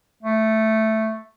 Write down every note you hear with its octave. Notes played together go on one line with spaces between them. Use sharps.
A3